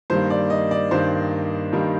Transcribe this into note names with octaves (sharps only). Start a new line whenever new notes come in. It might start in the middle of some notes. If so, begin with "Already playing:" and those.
G2 D#3 G3 A#3 C5
D5
D#5
D5
G2 D#3 G3 A#3 C5
G2 D#3 G3 A#3